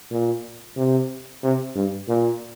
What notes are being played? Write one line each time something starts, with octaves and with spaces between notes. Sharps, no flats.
A#2
C3
C3
G2
A#2